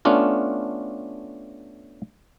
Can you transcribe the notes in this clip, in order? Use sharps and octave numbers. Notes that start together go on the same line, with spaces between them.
A3 B3 C#4 D4 F4